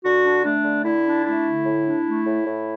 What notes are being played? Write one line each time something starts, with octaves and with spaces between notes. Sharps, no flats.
D3 F#4
D4
A3 D4
D3
D3 E4
D4
A3 E4
D3
A2
D4
A3
A2
A2